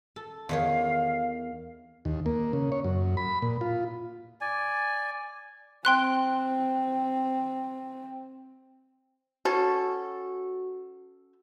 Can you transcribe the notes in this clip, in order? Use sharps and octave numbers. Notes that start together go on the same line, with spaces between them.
A4
E2 D#3 C#5 F5
D#2
A#3
C#3
C#5
F#2
B5
A#2
F4
D5 G#5
C4 G5 C6 F#6
C#4 F#4 A4